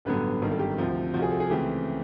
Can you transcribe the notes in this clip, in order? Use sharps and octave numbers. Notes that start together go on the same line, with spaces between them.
A1 G2 D3 F#3 B3 B4
G#1 G2 D#3 A#4
A4
G4
D2 C3 F3
C2 C3 F3 F#4
G#4
A4
G#4
C#2 C#3 E3 A3 C4 G4